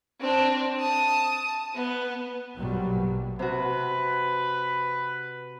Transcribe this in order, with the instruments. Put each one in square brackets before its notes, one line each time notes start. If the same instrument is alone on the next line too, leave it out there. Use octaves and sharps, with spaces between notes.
[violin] C4 D4
A5 D#6
B3
[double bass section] A#1 G2 B2 F#3 G3
[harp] C3 F#4 [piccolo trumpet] B4